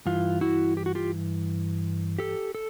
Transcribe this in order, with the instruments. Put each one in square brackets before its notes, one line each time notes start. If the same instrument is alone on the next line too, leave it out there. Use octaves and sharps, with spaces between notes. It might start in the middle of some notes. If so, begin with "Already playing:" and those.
[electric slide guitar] G2 E3 F4
E4 F#4
G4
F#4
F4 G4
G4 A4
A4